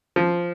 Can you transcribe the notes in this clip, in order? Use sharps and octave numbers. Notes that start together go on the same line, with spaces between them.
F3